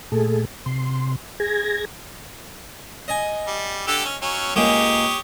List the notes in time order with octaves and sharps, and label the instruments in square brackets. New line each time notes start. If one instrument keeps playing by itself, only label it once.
[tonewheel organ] A#2 A3 G#4 A4
C3 C6
G#4 G#6 A#6
[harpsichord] D#5 G#5
[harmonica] G3
D3 G4 A4
C#4
F#3 C#4
[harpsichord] C#2 G#3 A#3 [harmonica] G4 C#5 D#6